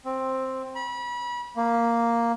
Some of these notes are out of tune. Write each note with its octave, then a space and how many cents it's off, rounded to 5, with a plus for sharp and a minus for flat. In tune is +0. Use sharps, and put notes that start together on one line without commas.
C4 +5
B5 -35
A#3 +0